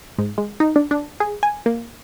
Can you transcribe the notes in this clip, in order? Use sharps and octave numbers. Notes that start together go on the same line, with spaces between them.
G#2
G#3
D#4
D4
D4
G#4
G#5
A#3